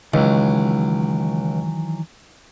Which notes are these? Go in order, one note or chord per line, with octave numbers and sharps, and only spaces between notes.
C#2 D#3 E3 F#3